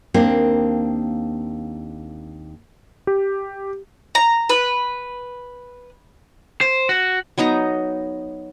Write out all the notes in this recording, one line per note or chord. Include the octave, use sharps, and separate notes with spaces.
D#2 A#3 C4 D4
G4
A#5
B4
C5
F#4
F#3 B3 D#4 A#5